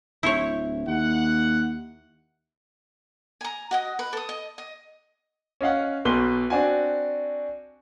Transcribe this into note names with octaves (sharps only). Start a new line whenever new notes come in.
D1 E4 C5 C#5
D#2 F#5
G#5 A#5
F#4 D#5 D#6
B4
A4 D#6
D#5
D#5
C#4 D#5 F5 F#5
B1 B2 B4 C6 G7
C4 D4 F#4 G#5